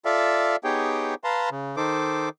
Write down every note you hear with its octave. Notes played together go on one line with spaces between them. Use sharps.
F4 A4 D5 E5 F5
B3 D#4 G4 G#4 C#5 G5
B4 F5 A5 A#5 C6
C#3
D#3 D#4 A4 C5 D6